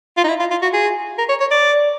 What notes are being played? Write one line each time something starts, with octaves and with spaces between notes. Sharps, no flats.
F4
D#4
E4
F4
F4
F#4
G#4
A#4
C#5
C#5
D5